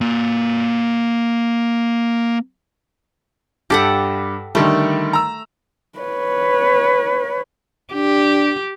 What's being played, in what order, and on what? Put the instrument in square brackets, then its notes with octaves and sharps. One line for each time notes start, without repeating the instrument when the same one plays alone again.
[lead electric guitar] A#3 G#5
[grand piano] G2 D6 B6 [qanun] G4 A4 F#5
[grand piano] D3 D#3 G3 [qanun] A3
[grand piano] A#5 E6
[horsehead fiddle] B4 C#5
[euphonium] D4 [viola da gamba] G4